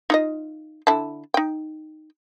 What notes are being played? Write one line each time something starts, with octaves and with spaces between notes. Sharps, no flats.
D#4 F4 D#5
D3 E4 A5
D#4 G5